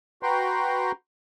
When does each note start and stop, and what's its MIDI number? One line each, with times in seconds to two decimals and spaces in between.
0.23 0.92 66
0.23 0.92 71
0.23 0.92 79
0.23 0.92 82
0.23 0.92 84